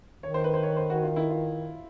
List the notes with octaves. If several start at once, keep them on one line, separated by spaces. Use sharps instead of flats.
D#3 C#5
C5
B4
C5
C#5
C5
F#4
F4
E4
F4